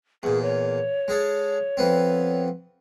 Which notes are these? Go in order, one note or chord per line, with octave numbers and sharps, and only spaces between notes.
E2 A#2 G#4
C#5
G#3 G#4 A4
F2 B3 C4